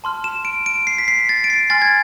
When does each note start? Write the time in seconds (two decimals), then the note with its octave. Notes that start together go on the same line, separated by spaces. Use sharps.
0.04 A5 C6 F6
0.24 E7
0.45 D7
0.66 D7
0.87 C7
0.98 B6
1.08 C7
1.29 A6
1.44 D7
1.50 C7
1.70 G#5 C6 F6 A6
1.82 G#6